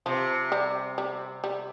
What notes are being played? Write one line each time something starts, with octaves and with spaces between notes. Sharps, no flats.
C3 F3
G3
G3
G3